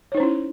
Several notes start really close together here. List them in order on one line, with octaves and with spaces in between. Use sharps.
C#5 D#4 C5 C#4 E4